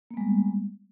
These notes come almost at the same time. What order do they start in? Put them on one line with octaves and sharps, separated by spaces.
A#3 B3 G#3 G3